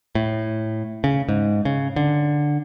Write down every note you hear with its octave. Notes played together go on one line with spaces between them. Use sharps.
A2
C#3
G#2
C#3
D3